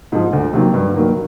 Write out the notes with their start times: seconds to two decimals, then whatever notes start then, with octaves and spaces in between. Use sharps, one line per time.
0.12 G#2 F3
0.33 D2
0.53 C3 D#3 F#3 A#3
0.74 G2
0.94 D#3 F#3 A#3